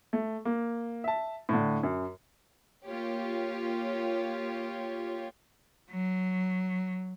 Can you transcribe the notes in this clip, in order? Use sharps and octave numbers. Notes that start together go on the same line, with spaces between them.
A3
A#3
E5 A5
A2 D3
F#2
A#3 F4 G4 C#5
F#3